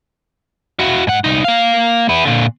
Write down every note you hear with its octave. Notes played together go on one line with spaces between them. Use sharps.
E4 F#4
G#2 F#5
C2 D#4
A#3 F5
B3 E4
A#2 D3